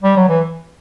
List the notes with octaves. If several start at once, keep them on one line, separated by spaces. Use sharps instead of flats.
G3
F#3
E3